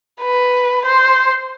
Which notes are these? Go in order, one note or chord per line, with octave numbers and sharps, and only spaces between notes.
B4
C5